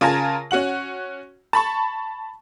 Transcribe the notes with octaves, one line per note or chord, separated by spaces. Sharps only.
C#3 F4 A#4 G#5 A5 A#6
C#4 F#4 F#5 F#7
A5 B5 C#6